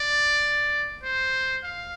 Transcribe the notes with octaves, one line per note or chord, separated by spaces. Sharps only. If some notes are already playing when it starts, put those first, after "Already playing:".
Already playing: D5
C5
F5